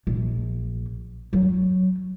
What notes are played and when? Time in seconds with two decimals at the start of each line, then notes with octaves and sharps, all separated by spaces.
0.07 A#1
1.33 F#3